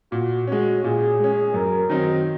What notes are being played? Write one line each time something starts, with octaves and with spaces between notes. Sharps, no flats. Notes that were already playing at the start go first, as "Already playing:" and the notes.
A#2 F#4
G#3 C#4 F#4
A#2 G#4
G#3 C#4
F#2 A#4
D#3 F#3 C4 D#4